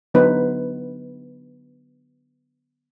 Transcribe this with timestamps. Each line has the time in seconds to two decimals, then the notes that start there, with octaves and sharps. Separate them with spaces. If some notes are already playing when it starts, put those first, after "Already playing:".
0.14 D3 F#3 B3 D#4 B4 C5